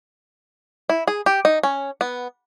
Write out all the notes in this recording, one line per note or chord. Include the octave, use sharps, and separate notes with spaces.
E4
G#4
G4
D#4
C#4
B3